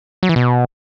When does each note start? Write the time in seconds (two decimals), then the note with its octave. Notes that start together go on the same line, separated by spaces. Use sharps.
0.23 F#3
0.29 E3
0.36 B2